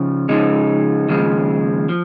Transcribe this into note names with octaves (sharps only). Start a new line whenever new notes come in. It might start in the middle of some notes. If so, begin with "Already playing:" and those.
Already playing: C#3 F3
C#3 F3 G#3 D#4
D#2 C#3 F3 G#3
F3